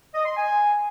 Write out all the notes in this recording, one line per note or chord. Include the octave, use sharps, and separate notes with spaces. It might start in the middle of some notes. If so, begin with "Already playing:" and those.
D#5
C6
G#5